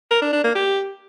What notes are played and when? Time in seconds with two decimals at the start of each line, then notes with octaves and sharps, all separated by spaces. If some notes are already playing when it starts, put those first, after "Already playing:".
0.11 A#4
0.22 D4
0.33 D4
0.44 A#3
0.55 G4